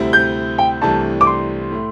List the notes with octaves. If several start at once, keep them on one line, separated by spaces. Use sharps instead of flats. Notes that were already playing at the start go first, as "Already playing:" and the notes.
Already playing: D2 C3 G3 C4 E4
G6
G5
C2 C3 E3 A3 D4 A5
D6
C6
A2 A3